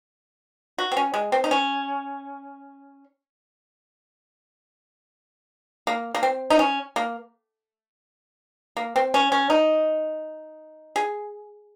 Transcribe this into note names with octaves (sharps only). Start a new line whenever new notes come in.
F#4
C4
C#4
G#3
C4
D#4
C#4
A#3
A#3
C4
D#4
C#4
A#3
A#3
C4
C#4
C#4
D#4
G#4